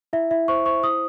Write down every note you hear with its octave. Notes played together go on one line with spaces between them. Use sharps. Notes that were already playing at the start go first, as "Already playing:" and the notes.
E4 E5
E4 E5
C5 C#6
C5 C#6
E4 D#6